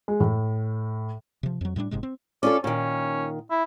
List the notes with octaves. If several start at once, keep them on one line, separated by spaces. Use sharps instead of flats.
G#3
A2
C3 F3
F2 F#3
A2 G3 G#3 D4
F#1 G#2 C3 G#3
C4
C#4 F4 A4 D5
A#2 D#3 C#4
E4